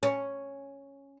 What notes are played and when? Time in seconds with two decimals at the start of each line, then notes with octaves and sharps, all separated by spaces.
0.03 C#4